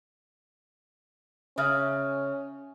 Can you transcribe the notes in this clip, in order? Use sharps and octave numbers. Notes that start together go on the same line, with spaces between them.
C#3 C#4 E5 F6